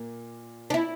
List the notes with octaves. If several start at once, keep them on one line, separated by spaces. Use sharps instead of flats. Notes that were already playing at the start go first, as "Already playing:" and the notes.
Already playing: A#2 A#3
D4
E4